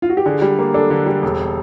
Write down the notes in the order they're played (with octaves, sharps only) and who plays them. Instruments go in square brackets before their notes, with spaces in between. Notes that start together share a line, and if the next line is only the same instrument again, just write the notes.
[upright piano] F4
F#4
G4
[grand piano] D3 [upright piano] G#4
[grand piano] G3
A#3
[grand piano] D4 [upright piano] A4
[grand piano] D3
G3
E1